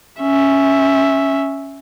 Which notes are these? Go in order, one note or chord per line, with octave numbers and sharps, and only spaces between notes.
C#4 E5